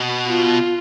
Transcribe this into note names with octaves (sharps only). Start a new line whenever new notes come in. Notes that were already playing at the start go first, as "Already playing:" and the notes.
Already playing: B2
F4